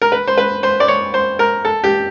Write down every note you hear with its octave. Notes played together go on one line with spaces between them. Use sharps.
A#4
B4
C5
B4
C5
D5
C#5
C5
A#4
A4
G4